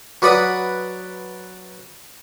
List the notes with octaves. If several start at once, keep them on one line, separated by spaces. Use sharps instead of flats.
F#3 B4 D5 F#5 B5 D#6